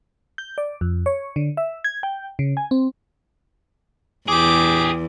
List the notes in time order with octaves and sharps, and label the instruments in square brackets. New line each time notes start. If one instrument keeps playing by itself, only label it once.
[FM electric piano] G6
D5
F2
C#5
D3
E5
G#6
G5
C#3
G#5
C4
[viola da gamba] E2 [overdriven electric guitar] G4 G#4 [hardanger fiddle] D6